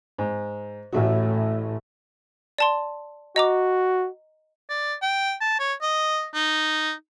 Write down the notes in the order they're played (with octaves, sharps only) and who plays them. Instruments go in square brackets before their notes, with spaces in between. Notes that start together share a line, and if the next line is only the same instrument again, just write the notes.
[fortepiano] G#2
[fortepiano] A1 A3 F#4 [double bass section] A2
[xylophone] D5 A5 C6
[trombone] F#4 [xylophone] D#5 A#5 D6
[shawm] D5
G5
A5
C#5
D#5
D#4